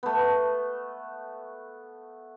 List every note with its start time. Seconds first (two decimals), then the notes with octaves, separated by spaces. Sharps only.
0.03 A3 B3